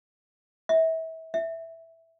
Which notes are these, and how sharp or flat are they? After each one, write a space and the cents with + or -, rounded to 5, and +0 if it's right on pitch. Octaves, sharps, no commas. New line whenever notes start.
E5 -30
E5 -5